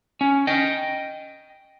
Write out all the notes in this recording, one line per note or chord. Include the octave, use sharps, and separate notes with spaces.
C#4
D#5 G5